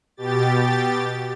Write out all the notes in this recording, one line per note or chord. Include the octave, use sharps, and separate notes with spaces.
B2 G4 A6